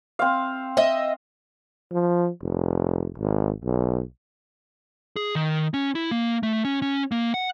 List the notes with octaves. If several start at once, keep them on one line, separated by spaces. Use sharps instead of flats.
C4 F5
D#5 E5
F3
F1
G#1
B1
G#4
D#3
C#4
E4
A#3
A3
C#4
C#4
A#3
F#5